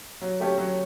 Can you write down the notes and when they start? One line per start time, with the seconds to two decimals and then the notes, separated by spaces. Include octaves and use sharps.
0.21 F#3
0.40 A3 C#4 G4 C#5
0.58 F#3